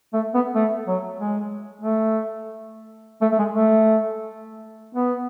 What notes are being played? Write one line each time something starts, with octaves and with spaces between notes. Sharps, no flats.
A3
B3
A3
F#3
G#3
A3
A3
A3
G#3
A3
B3